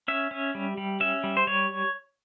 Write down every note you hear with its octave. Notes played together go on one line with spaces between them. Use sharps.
C#4 E5
C#4
G3
G3
C#4 E5
G3
C5
G3 C#5